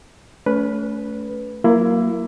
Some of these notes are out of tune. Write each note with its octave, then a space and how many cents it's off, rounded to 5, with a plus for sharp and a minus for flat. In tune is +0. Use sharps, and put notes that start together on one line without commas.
A3 -10 C#4 +30 B4 -5
F#3 +0 A#3 +0 E4 +20